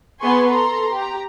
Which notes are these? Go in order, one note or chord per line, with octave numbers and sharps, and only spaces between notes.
B3 G#4 B4 G#5 C6 C#6
A4 A#5 C6
G4 A#5